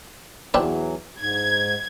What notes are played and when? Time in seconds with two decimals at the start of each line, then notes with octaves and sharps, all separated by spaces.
0.54 E2 E3 F#3 C4 D4 B4
1.20 G#2 G#6